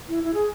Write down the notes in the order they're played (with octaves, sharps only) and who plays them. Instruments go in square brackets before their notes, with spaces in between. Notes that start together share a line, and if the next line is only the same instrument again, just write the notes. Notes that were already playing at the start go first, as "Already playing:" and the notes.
[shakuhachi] E4
E4
G#4